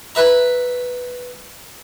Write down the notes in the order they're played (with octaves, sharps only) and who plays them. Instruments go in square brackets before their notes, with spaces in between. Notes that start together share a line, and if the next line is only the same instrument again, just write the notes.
[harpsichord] B4 E5 A#5